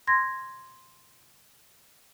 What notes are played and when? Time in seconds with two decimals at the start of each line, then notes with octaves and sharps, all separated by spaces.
0.07 C6 G#6 A#6